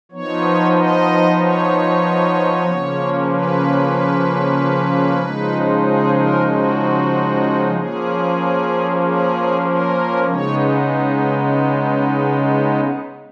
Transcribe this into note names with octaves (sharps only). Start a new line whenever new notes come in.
F3 B3 D#4 C#5
D#5
C#5
C#3 F3 A#3 C#4
B4
C#3 F3 G#3 D#4
G#4
A#4
F#4
F3 A#3 C#4 G#4
G#4
A#4
C#3 G#3 B3 D#4 C#5